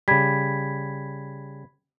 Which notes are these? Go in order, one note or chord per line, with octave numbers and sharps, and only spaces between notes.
C#3 G3 B5 G#6 B6